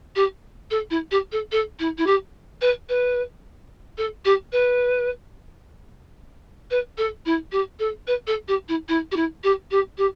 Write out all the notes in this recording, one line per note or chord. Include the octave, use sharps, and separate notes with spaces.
G4
A4
E4
G4
A4
A4
E4
E4
G4
B4
B4
A4
G4
B4
B4
A4
E4
G4
A4
B4
A4
G4
E4
E4
G4
E4
G4
G4
G4